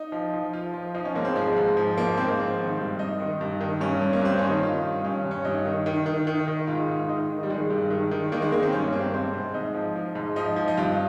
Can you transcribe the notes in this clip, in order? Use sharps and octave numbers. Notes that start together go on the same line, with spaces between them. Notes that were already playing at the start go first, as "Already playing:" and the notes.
Already playing: D#4
F3
F3
F3 F4
F3
F3 D#4
C#4
G#2 A#3
C4
F3 G#3
G#2
F3
F3 A#3
G#2 C4
A#3
F3 C4
D#3
G2
G2 D#4
D#3
G2
D#3
G2 C#4
G2
A#3
G2 C4
D#3 C#4
D#4
D#3 F4
G2
G2 C#4
G2
C#4
G2 D#4
D#3
D#3
D#3
D#3
D#3
G#2 F4
G#2
D#3 D#4
D#3
G3
D#3 G#3
G2
D#3
D#3
D#3 A#3
G#3
D#3 A#3
C4
G2 C#4
G2 A#3
C4
G#2 C4
G#2
G#2 D#4
F3
F3
G#2
F3 D#4
F3
D#4
G2 F4